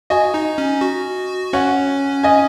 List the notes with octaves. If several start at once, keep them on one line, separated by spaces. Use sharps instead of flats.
F#4 D#5 G#5
D#4
C#4
F#4
C#4 C#5 F#5
D#5 G#5